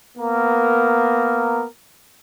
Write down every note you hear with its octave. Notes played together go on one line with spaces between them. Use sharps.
A#3 B3 A#4